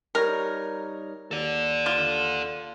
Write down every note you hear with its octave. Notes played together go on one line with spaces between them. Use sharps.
G3 D#4 A#4 C#5
D#2 A4 D5
F4